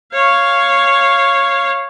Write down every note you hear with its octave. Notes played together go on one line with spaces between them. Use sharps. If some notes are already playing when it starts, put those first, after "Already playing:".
C#5 F5